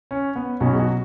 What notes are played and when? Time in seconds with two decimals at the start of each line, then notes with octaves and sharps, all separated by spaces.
0.11 C#4
0.36 B3
0.60 B1 B2 F#3 C#4
0.73 G#4
0.79 F#4